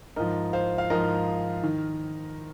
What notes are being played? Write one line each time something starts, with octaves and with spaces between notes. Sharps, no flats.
G#2 F3 A#4 D#5
C5 F5
F5
G#2 F3 A#4 D#5
D#3